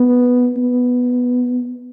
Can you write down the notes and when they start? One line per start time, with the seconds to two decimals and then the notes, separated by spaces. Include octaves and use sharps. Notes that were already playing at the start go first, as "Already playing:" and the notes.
Already playing: B3
0.57 B3